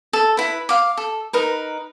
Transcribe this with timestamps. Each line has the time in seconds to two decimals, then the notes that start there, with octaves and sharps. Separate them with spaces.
0.13 A4
0.37 E4 B4
0.69 F5 D6
0.97 A4
1.33 D#4 A#4 B4